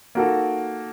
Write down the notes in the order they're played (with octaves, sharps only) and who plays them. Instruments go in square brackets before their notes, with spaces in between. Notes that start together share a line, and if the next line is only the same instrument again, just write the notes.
[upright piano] A#3 D#4 F#4 A4